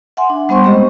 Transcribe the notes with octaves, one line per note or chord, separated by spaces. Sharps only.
E5 F#5 G#5 C6
D4
G3 B3 C5 C6 C#6
G#3 C4 G4 D#5